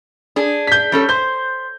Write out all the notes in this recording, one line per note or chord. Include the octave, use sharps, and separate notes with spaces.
D4 G#4
G6 B6
G3 C#4 A4
C5 G6